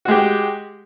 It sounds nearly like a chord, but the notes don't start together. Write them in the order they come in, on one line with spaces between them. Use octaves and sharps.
F#4 G#3 G4